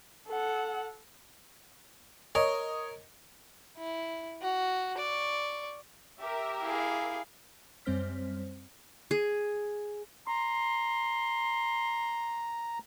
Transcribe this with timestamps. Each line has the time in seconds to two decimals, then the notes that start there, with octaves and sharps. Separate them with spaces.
0.28 A4 F#5
2.35 A#4 C#5 D#5
3.77 E4
4.42 F#4
4.98 D5 C#6
6.19 G4 A#4 E5
6.62 E4 G#4 F5
7.85 F#2 G3 C4 C5 F6 B6
9.11 G#4
10.28 A#5 C6